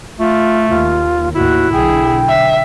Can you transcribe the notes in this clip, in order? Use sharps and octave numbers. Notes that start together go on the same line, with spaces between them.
A3 F4
D#2 F4
D#2 A2 E4 F#4
B1 D3 G#4 G5
E5